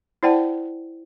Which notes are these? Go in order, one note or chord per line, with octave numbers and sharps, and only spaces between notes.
E4 C5 D5 F#5 G5 A5